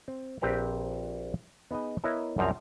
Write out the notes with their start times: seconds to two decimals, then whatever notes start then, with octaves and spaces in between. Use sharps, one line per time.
0.08 C4
0.41 A#1 C4 G4 B4 G5 A#5
1.71 B3 D#4 G#4 D#5
2.04 B3 E4 A#4 C#5 D#5 E5
2.38 C2 F#2 F3 C4 A#5